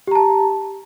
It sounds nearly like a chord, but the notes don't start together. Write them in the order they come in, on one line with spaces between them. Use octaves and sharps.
G4 A#5 A5